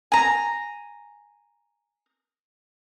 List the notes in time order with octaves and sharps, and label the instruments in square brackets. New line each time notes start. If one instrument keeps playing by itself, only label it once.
[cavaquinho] G#5 A#5